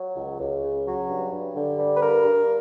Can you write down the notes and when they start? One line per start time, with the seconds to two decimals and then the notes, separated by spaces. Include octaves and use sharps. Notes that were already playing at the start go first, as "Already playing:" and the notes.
Already playing: F#3
0.15 C#2
0.39 C#2
0.62 C#3
0.86 F#3
1.08 G2
1.31 G2
1.55 D3
1.78 G3
1.95 B4
2.00 G2 A#4
2.23 G2